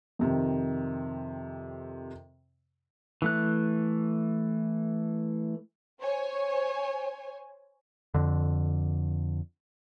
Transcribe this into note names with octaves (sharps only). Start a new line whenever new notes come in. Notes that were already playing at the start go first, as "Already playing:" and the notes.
F2 C3 D#3
E3 A3 F#6
C5 C#5 G#5
F2 D3